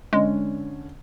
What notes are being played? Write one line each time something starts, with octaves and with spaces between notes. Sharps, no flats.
D3 G#3 C#4